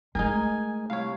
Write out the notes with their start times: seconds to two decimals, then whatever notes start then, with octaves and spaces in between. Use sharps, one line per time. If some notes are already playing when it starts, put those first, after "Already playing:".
0.15 G#3 A3 D#4 G#4 A#4 G#5
0.90 C2 C#5 F5